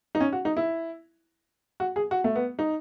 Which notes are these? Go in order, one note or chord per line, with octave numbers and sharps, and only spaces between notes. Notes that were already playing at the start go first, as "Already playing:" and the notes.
D#4
C#4
F#4
D#4
E4
F#4
G#4
F#4
A3
B3
D#4